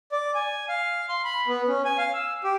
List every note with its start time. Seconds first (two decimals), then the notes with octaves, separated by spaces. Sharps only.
0.12 D5
0.35 G#5
0.69 F5
1.09 C6
1.24 B5
1.47 B3
1.68 C#4
1.85 G#5
1.98 F5
2.14 E6
2.44 G4